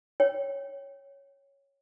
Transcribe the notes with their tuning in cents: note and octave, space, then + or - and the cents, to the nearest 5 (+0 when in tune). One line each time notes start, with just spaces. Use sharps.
C#5 +0 G5 +0